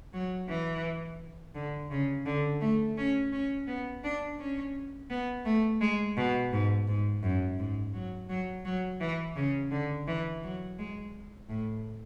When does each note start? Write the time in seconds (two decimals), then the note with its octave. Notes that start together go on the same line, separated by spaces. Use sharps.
0.13 F#3
0.48 E3
1.55 D3
1.91 C#3
2.26 D3
2.61 A3
2.97 C#4
3.32 C#4
3.67 B3
4.04 D4
4.39 C#4
5.10 B3
5.45 A3
5.81 G#3
6.17 B2
6.52 G#2
6.87 G#2
7.23 F#2
7.59 G#2
7.94 F#3
8.29 F#3
8.65 F#3
9.00 E3
9.36 C#3
9.71 D3
10.07 E3
10.43 F#3
10.79 G#3
11.49 A2